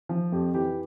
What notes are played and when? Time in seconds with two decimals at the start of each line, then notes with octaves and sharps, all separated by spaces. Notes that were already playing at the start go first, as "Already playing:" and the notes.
0.09 F3
0.32 F2 G4
0.54 E3 G4